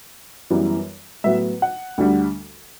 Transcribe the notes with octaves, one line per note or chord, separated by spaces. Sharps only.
F#2 E3 G3 B3
A2 F#3 B3 E5
F#5
D2 D3 G3